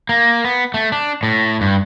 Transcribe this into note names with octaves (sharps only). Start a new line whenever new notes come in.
A#3
B3
A3
D4
A2
G2